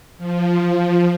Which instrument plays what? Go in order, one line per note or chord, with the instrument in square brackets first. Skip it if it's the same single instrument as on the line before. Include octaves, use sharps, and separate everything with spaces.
[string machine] F3